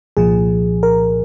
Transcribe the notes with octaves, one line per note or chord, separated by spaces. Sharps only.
C2 A#2 F3 G#4
A#4